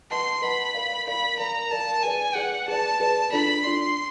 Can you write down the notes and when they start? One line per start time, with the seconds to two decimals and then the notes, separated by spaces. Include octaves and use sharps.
0.11 B4 D#5 F#5 A5 C6
0.42 B4 D#5 F#5 A5 B5
0.74 A#4 D5 F5
1.07 A#4 D5 F5 B5
1.39 A#4 D5 F5 A#5
1.71 A#4 D5 F5 A5
2.03 G#4 B4 D5 G#5
2.35 G#4 B4 D5 F#5
2.68 G#4 B4 D5 A5
3.00 G#4 B4 D5
3.32 D4 F4 A4 D5 B5
3.64 D4 F4 A4 D5 C6